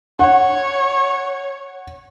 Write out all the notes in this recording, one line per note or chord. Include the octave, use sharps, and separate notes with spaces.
C#5 F#5